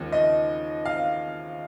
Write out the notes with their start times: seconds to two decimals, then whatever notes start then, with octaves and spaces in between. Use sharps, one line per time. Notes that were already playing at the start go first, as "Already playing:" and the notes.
Already playing: D#2 C#3 F3 G#3
0.12 D#5
0.85 F5